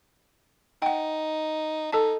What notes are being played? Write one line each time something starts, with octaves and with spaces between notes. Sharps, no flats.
D#4 F#5 G5
D#4 A4 D#5 A5